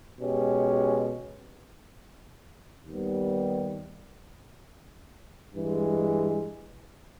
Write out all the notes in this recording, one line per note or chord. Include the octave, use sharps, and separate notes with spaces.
B2 G#3 C#4 G4
D#2 D#3 G3 B3
G2 E3 G#3